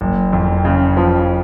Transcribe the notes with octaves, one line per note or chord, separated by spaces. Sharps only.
F#1
F2
C#3
F3